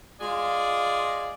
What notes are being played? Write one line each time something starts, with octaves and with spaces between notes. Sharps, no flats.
G#3 F4 G#4 D5